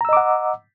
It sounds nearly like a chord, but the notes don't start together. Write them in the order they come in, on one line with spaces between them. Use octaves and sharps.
A#5 E6 D#5 D6 F#5